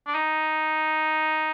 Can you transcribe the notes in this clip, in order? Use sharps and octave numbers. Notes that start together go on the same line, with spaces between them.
D4
D#4